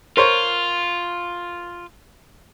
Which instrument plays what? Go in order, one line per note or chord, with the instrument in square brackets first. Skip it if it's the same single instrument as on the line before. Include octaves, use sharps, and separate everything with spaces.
[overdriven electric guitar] F4 [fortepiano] A#4 C5 C#5